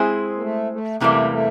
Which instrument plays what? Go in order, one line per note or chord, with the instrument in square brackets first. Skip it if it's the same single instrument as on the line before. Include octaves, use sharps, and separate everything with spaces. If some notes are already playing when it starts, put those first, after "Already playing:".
Already playing: [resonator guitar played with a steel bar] G#3 C4 E4 G#4 C5
[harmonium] A#3
A3
A3
[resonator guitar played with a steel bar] E2 C3 E3 G3 A#3 [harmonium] A3
[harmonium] A3